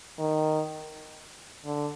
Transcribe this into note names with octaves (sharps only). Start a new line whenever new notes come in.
D#3
D3